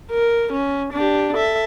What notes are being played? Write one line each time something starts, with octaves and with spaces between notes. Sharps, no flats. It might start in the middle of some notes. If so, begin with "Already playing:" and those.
A#4
C#4
D4 G4
A4 E5